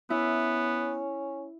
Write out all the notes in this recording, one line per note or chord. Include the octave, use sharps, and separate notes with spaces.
B3 C#4 E4